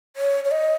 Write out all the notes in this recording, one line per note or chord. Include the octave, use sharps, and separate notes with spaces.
C#5
C#5
D#5